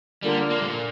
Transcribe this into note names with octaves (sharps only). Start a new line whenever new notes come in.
D3 G3 A#3 F4 A#4 D5
A#3
G2
A#2